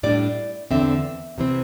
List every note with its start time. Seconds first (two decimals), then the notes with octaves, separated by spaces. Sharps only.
0.03 A2 G3 D4 D5
0.71 E2 D3 C4 E5
1.38 C3 E3 C4